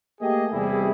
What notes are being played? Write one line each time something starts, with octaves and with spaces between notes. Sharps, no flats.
A3 A#3 G4 G#4 D#5
E2 C3 G3 E4 G#4